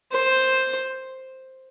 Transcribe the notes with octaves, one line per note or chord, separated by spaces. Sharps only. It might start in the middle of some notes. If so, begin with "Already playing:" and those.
C5